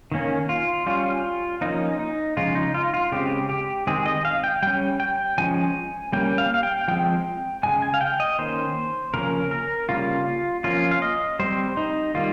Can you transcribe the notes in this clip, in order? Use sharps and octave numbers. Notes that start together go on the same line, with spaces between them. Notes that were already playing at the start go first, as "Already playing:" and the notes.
D#3 A#3 C#4
F4
G3 C#4 F4
F3 A#3 C#4 D#4
D#4
C#3 F3 G#3 F4
D#4
F4
F4
C#3 G#3 C4 G4
G4
D#3 G#3 C4 G#4
D#5
F5
G5
G3 C#4 G5
G5
F3 G#3 C#4 G#5
G3 A#3 C#4 G5
F5
F5
G5
F3 G#3 C4 G5
C#3 F3 G#3 G#5
G#5
F5
G5
D#5
D#3 A#3 C#4 C5
C#3 F3 A#3 C#4 A#4
A#4
C#3 G3 A#3 F4
F3 A#3 C#4 F4
F5
D#5
G3 C4 C5
D#4
D#3 G3 A#3 F4